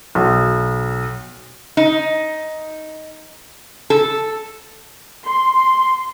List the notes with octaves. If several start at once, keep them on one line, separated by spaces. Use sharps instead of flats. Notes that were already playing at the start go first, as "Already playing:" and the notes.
B1
D#4
A4
C6